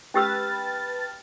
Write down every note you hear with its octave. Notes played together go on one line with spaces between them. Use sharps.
C#4 G4 B4 G5 A5 E6 F6 A6